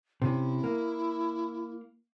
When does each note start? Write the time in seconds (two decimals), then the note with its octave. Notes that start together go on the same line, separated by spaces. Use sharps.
0.22 C3 C#4 E4
0.64 A#3